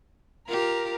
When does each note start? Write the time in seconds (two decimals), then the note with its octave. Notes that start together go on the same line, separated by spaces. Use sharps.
0.47 F4 G4 A#4